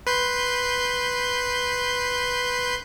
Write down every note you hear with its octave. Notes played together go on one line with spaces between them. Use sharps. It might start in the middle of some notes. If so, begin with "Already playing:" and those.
B4 C6 G6